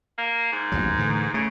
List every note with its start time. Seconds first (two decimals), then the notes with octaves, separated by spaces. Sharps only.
0.18 A#3
0.52 G#2
0.72 A1 D#2 F#3
0.97 A2 D3 E3
1.34 C#3 A3